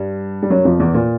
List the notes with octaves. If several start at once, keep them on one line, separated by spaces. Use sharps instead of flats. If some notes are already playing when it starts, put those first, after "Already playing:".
Already playing: G2 G3
G3
F#2 F#3
F2 F3
E2 E3
A#2